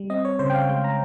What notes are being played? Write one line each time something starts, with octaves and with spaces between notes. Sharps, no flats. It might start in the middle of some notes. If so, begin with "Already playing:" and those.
Already playing: G3
C4 D#5
C#5
C#3 C5
G5
F5
G#3 G5
A#5